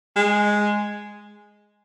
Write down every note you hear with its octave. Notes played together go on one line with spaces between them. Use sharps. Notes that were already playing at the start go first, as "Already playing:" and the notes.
G#3